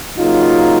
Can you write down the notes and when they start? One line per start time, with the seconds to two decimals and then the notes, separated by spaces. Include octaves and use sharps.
0.18 C#3 F#3 A#3 D#4 F4